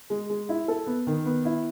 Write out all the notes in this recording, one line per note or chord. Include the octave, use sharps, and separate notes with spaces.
G#3
G#3
E4
A4
B3
D#3
B3
E4